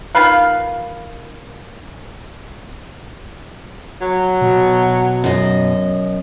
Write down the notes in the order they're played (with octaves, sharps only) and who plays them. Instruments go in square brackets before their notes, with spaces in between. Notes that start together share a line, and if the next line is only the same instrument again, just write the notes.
[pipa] D#3 F4 B4 F5
[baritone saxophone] F#3
[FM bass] B2
[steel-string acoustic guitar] F#2 D#5